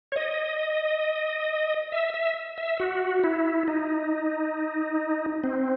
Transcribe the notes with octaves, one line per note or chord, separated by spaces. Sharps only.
C#5
D#5
E5
E5
E5
F#4
E4
D#4
C4